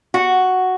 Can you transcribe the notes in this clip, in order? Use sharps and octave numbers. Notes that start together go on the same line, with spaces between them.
F#4